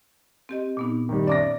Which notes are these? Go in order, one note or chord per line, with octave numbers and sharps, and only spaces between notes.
C4 G4 D#5
A#2 B3 D#4
D#3 G3
C#4 D5 E5 D6 A#6